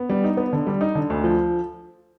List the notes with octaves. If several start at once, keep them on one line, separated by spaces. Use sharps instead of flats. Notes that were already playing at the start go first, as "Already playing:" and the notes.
Already playing: B3
G3
D#4
B3
D3
G3
D#4
D3
D2
F3